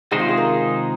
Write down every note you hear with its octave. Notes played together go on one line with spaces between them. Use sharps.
C3 D#3 G#3 D#4 G#4 C5
F4
G#4
A#4